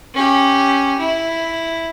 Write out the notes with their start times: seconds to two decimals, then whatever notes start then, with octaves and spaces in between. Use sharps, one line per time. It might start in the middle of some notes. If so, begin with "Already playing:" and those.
0.14 C#4 G4
1.00 E4